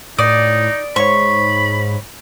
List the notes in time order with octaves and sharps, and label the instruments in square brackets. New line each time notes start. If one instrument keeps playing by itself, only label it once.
[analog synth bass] A2 [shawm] D#4 [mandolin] D5 [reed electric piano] D#6
[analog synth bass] G#2 [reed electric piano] C5 C#5 [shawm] B5 [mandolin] C#6